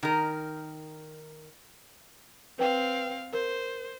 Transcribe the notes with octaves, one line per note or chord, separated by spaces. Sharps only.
D#3 A#4
C4 B4 F5 G5
A#4 C5